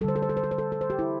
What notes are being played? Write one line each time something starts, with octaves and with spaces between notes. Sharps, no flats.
D3 G3 A4 C5
A4
C5
A4
C5
A4
C5
A4
A4
C5
G4
E4